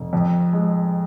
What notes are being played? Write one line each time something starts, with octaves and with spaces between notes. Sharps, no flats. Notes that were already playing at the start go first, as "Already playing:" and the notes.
Already playing: F1
F2
G#3